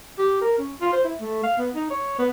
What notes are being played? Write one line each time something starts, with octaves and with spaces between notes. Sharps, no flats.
G4
A#4
C#4
F4
C5
E4
A3
F5
B3
D#4
C#5
B3